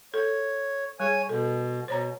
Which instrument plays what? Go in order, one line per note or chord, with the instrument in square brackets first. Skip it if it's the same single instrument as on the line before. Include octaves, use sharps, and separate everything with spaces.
[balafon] A4 [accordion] C#5
[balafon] G3 G#4 [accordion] C#5 G#5
[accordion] B2 [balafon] A4
[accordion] B2 [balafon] C5 C#5 A#5